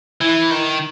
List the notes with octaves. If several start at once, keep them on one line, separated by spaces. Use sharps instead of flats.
E3 E4
D#3